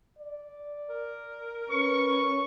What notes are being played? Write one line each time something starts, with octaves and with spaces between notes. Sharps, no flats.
D5
A#4
C#4 B4 C#6